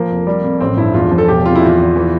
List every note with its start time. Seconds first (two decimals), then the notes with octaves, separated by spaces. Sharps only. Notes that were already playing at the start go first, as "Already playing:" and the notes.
Already playing: F3 A#3
0.11 F1
0.27 G3
0.44 F2
0.60 A1 C4
0.77 G2 E4
0.94 E2 F4
1.11 F3
1.18 A4
1.28 E1 G4
1.46 C3 F4
1.55 E4
1.62 E2 F4
1.79 E2
1.96 E3